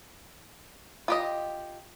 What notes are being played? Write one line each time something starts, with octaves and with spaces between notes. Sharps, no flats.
F4 G4 D#5